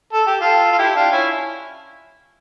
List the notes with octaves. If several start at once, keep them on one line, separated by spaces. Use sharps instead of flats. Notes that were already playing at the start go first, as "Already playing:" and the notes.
A4
G4
F4 A4
F4
E4 G4
E4
D4 F4
C#4 E4